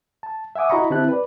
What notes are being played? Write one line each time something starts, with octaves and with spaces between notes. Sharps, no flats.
A5
E5 F#5 G#5 D6 D#6
E4 F#4 D#5 A#5 B5 C#6
D3 C4 E4 G4 A5 F#6
B4 D5